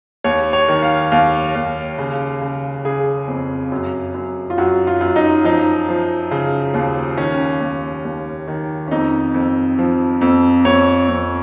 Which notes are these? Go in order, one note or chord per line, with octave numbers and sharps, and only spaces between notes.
D#2 C#5
C#5
D#3
F5
D#2 F5
D#2
C#3
C#3
C#3 G#4
F2
F#2
F#2
F4
F#2 F#4
F4
F#2
D#4
F3 D#4
F3
C#3
D#2
D#3 C#4
D#2
D#2
D#3
C#4
F2 D#4
F2
F3
F2
F2 C#5
F2